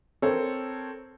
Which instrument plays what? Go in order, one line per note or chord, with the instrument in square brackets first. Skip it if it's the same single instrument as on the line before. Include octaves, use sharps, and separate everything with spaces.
[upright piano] C4 A4 A#4 C#5